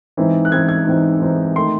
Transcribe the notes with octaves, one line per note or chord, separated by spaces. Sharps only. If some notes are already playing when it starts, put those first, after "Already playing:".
G#2 E3 C4 D#4
F#6
G#2 E3 C4 D#4 G#6
G#6
G#2 E3 C4 D#4
G#2 E3 C4 D#4
D#3 A3 D#4 C6